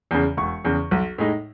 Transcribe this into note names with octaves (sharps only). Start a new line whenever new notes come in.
E2 C#3
E1 C#6
E2 C#3
B1
A2 G#3 D#4